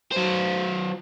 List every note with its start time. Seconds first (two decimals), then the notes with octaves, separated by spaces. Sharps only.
0.12 F#3 C5